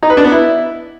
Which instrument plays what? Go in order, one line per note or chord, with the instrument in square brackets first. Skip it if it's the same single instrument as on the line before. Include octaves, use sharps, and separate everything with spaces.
[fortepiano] D#4
B4
D4
B3
E4